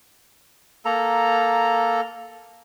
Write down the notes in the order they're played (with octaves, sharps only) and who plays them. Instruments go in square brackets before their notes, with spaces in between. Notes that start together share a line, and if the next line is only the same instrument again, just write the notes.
[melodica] A#3 A4 A#5